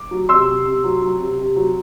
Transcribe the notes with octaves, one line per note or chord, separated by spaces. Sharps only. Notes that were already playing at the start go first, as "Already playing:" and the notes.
Already playing: D6
F#3
C3 C6 E6
C3
C3
F#3
F#3
C3
C3
F#3